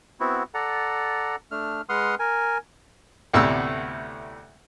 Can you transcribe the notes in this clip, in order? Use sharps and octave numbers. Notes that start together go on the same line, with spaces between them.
B3 C4 E4 F#4
A4 D5 F#5 A#5
A3 D4 F6
G#3 B4 F#5 C6 D#6 F6
A#4 G#5
D2 A2 C3 B3 E6